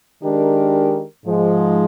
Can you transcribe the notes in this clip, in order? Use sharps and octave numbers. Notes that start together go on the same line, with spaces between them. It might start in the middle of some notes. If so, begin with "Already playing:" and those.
D#3 G#3 D4 G4 A#4
G#2 F3 G#3